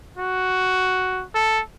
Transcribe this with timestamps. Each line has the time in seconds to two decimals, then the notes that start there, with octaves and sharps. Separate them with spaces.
0.17 F#4
1.35 A4